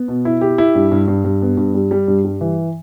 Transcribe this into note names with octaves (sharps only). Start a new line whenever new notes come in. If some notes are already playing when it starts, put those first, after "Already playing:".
Already playing: B3
B2
E4
G4
E4
G2
G2
G2
G2
B3
G2
G3
G3
G2
G3
E3